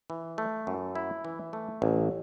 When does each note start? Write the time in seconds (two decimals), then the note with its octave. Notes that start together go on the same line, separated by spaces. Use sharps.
0.10 E3
0.38 A3
0.67 F#2
0.95 E4
1.25 E3
1.53 A3
1.82 A1